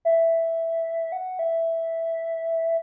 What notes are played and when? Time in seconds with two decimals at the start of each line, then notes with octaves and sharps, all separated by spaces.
0.05 E5
1.12 F#5
1.39 E5